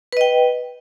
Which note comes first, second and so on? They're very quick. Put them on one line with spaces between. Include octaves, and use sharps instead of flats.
B4 D#5 G5